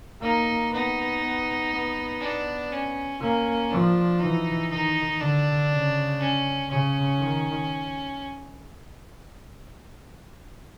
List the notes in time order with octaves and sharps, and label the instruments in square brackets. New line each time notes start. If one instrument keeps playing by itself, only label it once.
[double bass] A#3 [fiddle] D#4
[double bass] B3 [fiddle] D#4
[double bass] B3
B3
[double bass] B3 [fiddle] D4
[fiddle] C#4
[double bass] A#3 [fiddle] C#4
[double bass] F3 [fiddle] D4
[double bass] E3 [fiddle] D#4
[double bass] D#3 [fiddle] D#4
[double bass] D3 [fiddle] D4
[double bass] C#3
[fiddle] C#4
[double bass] C#3 [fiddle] C#4
[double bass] D#3